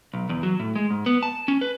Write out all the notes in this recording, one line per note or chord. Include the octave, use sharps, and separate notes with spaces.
B1
E2
F#3
A2
G#3
G#2
B3
A5
C#4
B4